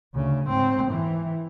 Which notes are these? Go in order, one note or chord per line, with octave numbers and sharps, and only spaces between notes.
D2 C#3
G#2 C4
E3